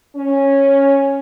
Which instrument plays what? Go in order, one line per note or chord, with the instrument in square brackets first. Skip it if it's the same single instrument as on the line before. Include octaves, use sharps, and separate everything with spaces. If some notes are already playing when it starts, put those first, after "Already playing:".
[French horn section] C#4